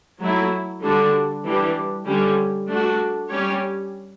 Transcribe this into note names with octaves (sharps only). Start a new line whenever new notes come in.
F#3 A3 E4
D3 G3 D4 F#4
E3 G3 D4 G4
D3 G3 C#4
A3 D4 F#4
G3 C#4 G4 C#5